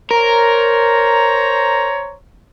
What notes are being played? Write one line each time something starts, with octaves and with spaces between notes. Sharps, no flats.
A#4 C5 C#5 A#5